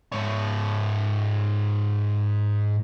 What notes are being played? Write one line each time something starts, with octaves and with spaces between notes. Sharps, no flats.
G#2 C#5